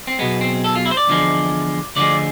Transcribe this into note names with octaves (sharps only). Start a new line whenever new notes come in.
C4
B1 B2 G#3 B3
C4
A4
F4
E4
C5
D5
E2 D3 F3 G#3
D2 D3 F3 G#3 D5